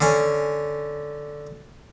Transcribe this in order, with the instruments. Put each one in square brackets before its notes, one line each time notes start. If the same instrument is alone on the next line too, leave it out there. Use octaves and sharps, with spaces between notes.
[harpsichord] D3 C#4